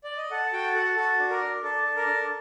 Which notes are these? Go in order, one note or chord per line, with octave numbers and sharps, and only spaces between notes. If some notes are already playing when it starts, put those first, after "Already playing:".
D5
D#5
A4 F#5
F#4 G5
A4 F#5
F#4 A4
D4
A#4
D4
D4 A4
A4
A#4
D4